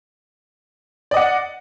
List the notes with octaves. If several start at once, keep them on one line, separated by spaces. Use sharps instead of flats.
D5 D#5 F#5